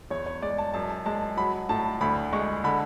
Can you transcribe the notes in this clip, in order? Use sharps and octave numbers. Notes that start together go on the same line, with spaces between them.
E2 C#5
C#5
G#3 D5
A5
F#2 A5
G#3 A5
F#3 B5
A2 A5
D2 B5
G#3 C#6
D3 B5